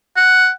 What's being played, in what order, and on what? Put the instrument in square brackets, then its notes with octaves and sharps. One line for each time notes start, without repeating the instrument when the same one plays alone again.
[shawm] F#5